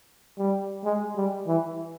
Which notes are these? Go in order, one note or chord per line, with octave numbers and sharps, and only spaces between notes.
G3
G#3
G3
E3